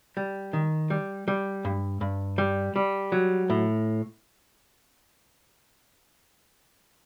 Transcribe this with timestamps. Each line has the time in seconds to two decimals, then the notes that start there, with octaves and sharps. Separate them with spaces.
0.17 G3
0.53 D#3
0.90 G3
1.28 G3
1.65 G2
2.01 G2
2.38 G3
2.76 G3
3.12 F#3
3.50 A2